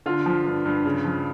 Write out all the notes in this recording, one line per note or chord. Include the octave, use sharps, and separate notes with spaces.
D3 F4
F3
G2
G2
C#3
F3